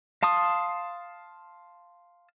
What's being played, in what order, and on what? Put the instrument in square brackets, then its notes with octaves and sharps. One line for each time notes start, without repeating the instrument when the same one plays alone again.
[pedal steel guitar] F5 A5 C6 D#6